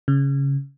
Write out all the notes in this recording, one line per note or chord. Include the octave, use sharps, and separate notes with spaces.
C#3